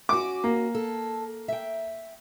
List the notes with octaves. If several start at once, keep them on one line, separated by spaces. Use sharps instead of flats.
C#4 F#4 D6
A#3
A4
E5 G5